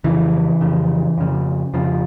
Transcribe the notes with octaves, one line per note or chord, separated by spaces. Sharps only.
F2 C#3 E3
F2 C#3
F2 C#3
F2 C#3 F3